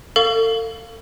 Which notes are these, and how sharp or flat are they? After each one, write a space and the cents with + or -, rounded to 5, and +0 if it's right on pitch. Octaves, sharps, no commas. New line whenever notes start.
A4 +35 F5 +0 C#6 +30